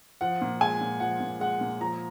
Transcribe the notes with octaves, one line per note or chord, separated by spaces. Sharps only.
F3 F#5
A#2
G#3 G#5
A#2
F3 F#5
A#2
G#3 F#5
A#2
F3 A#5